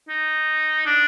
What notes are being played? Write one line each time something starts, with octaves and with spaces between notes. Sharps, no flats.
D#4
D4